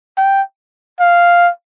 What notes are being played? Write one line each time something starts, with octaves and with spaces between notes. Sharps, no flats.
G5
F5